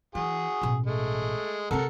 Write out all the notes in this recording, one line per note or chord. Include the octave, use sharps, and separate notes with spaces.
E3 F#4 G#4
A1 B2
G#3 A3
C3 C4 A4 A#4 F#5